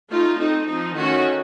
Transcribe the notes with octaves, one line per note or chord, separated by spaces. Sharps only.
A3 D#4 F4
A3 C4 D#4
F3 C4 D#4
D#3 A3 C#4 F#4